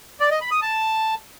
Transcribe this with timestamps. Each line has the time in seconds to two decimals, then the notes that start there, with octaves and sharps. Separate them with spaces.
0.20 D5
0.31 D#5
0.41 B5
0.51 D#6
0.62 A5